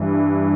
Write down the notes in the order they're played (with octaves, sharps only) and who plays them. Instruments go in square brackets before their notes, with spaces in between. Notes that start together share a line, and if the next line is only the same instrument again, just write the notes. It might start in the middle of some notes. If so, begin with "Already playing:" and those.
Already playing: [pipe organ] G2 E3